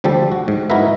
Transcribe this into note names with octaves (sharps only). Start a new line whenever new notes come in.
D2 F3 G3 G4 A4
F#4
G#2
D#4 E4 F#4 A#4 B4 E5